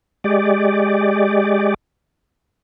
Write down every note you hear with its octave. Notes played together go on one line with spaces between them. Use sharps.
G#3 G4 D5